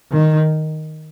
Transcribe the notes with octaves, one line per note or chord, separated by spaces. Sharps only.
D#3